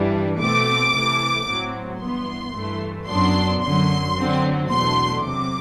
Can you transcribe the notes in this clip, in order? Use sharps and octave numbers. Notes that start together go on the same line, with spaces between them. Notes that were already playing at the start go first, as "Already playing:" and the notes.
Already playing: G2 E3 G3 D4
B2 A3 C4 D6
C3 E3 A3
A2 F#3 C4
G2 E3 B3 C6
G2 E3 A3
F#2 F#3 B3 D4 C6
F#2 D3 F#3 C6
D3 F#3 C4
E2 B2 F#3 A3 D4 C6
C3 F#3 C4 D6